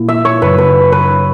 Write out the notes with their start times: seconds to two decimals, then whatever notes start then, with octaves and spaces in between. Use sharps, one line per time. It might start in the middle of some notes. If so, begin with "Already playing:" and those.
Already playing: A#2 A#3 E4
0.09 E5
0.25 C#5
0.42 F#2 C#3 F#3 B4
0.58 B4
0.92 B4